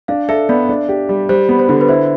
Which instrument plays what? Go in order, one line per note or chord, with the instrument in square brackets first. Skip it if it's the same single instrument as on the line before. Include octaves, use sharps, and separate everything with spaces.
[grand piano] D4 [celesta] F5
[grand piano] A4 [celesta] E5
[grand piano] B3 [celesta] D5
[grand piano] D4
G4
G3
[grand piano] G3 [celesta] C5
[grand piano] B3
[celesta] C5
[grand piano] D3
[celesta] B4
[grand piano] E4 [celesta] C5